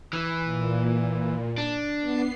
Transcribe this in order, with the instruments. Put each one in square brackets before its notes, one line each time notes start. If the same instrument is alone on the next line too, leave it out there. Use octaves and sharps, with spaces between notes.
[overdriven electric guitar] E3
[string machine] A#2
[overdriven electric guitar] D4
[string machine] B3 C7